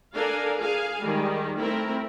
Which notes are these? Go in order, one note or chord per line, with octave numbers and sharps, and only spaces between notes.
D4 A4 A#4 F5 G#5
G#4 F5 G#5
D#3 G3 G#3
A3 C4 E4 A#4